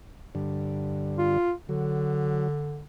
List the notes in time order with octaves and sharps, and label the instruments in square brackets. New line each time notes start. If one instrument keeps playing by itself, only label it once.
[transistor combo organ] G2 D3
[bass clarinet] F4
[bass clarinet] D3 [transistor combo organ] F#3